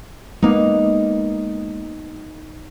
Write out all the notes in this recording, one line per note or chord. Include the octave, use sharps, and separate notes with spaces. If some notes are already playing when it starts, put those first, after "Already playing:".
G#3 A#3 B3 D#4